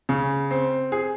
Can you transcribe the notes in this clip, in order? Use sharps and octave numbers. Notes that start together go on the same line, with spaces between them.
C#3
C4
G#4